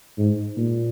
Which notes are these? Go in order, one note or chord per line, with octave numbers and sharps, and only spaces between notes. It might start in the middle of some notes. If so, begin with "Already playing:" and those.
G#2
A#2